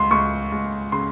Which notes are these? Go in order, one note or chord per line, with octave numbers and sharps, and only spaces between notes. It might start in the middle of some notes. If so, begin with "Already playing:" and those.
Already playing: C#2 C6
C#2 C#6
C#2
C#3 C6